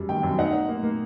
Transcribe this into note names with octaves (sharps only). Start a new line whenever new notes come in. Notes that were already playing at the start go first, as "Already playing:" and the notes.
Already playing: F#2 G3
D#3 G5
F#2
D#4 F#5
D#4
A#3
A#3